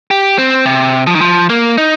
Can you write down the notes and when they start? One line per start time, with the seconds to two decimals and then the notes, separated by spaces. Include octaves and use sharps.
0.11 G4
0.38 C4
0.66 C3
1.07 F3
1.15 D#3
1.21 F3
1.50 A#3
1.78 D#4